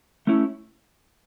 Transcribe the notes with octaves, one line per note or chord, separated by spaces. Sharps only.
A3 C#4 E4